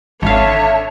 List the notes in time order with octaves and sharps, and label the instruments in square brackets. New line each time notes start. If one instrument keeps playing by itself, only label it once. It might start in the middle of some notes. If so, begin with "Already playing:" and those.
[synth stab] G#1 F5 [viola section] D3 D4 C#5 [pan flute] E5 [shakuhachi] A5